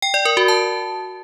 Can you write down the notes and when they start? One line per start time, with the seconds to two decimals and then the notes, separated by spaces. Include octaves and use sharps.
0.02 G5
0.14 D5
0.25 A#4
0.37 F#4
0.48 A5